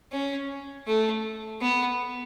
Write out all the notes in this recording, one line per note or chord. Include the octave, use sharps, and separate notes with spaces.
C#4
A3
B3